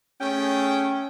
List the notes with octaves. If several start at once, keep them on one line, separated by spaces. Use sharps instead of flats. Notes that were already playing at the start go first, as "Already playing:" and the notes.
A3 C#4 G#4 G5